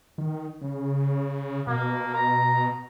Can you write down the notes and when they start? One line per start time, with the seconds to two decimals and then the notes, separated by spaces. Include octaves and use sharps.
0.18 D#3
0.62 C#3
1.67 B2 A#3
2.15 A#5